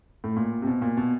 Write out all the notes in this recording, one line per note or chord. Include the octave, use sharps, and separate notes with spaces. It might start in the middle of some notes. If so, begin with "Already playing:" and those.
A2
A#2
C3
B2
A#2
B2